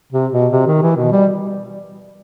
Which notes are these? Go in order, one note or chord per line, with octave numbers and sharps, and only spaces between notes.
C3
B2
C3
D#3
E3
B2
G3